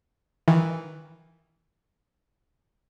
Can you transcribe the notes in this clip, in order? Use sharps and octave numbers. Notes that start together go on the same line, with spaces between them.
D#3 E3